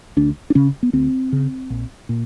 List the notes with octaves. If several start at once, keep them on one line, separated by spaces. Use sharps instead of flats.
D2 D4
D4
C#3 C#4
B3
D2 C4
C#3
A#1
A#2